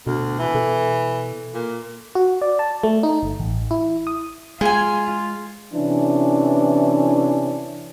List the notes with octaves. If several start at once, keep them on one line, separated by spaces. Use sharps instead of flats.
D2 B2
E3
B2 A4
A#2
F#4
D5
A5
A3
D#4
G1
A1
E4
D#6
G#3 F4 G#4 G#5
C3 E3 C#4 D4